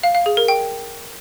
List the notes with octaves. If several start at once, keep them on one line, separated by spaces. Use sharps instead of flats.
F5
F5
G#4
A#4
G5